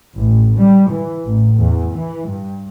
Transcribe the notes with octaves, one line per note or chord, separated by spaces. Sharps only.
A1
G3
E3
A1
E2
E3
G2